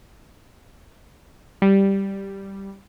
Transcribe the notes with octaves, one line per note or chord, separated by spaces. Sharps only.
G3